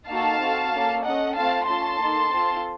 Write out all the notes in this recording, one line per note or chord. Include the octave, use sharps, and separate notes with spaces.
A#3 D#4 F#4 A4 F5 A5
C4 F#4 A4
A#3 C#4 A4
C#4 A4 D#5 F#5
A3 C4 F4 A4 F5 A5
C#4 F4 A4 A5 C6
A#3 D#4 A4
C4 F4 A4